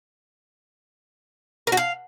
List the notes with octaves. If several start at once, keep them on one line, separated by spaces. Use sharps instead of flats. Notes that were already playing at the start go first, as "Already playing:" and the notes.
A#4
F#4
F5